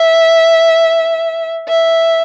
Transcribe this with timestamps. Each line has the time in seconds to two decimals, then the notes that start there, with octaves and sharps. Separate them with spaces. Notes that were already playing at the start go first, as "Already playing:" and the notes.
Already playing: E5
1.68 E5